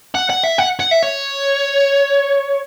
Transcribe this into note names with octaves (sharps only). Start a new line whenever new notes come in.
F#5
F#5
E5
F#5
F#5
E5
C#5